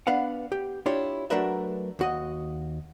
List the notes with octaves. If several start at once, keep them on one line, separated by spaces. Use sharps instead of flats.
B3 D4 B4 F5 F#5
G4
D4 E4 F4 G4 C#5
F#3 A3 D4 A#4 B4 E5
D#2 F#4 D#5